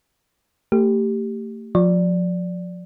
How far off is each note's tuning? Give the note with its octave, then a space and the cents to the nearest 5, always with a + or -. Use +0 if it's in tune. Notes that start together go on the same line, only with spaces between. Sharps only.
A3 +35 G4 +0
F3 +35 D5 +0